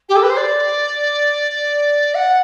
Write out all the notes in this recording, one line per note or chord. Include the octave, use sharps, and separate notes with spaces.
G4
A4
B4
C5
D5
F#5